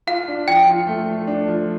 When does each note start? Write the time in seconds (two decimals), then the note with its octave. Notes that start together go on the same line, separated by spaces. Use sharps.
0.07 F4 F5
0.28 D4
0.48 F3 G5
0.67 F4
0.87 A3
1.07 A3
1.27 D4
1.48 F3